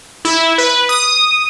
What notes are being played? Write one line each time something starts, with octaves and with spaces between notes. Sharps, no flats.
E4
B4
D#6